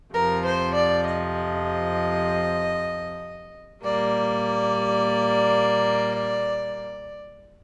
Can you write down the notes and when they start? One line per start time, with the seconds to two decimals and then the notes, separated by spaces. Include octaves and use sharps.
0.13 F2 C3 F3 A#4
0.44 C5
0.75 D5
1.06 D#5
3.83 A#2 G3 A#3 D5